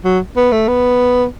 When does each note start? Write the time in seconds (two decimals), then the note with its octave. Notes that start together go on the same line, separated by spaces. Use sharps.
0.05 F#3
0.37 B3
0.52 A3
0.68 B3